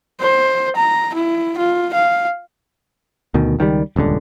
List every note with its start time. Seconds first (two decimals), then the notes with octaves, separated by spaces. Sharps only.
0.21 C5
0.77 A#5
1.15 E4
1.58 F4
1.94 F5
3.34 D2 B2 D#3
3.59 C#2 D#3 E3 G3
3.96 D#1 C#2 G2 D3